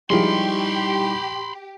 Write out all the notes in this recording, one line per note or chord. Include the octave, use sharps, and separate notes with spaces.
F3 G3 G#3 D#4 E4 G4 B5 C6